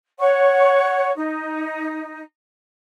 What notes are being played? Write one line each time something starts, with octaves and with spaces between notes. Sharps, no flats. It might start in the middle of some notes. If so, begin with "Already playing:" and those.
C#5 F#5 C#6
D#4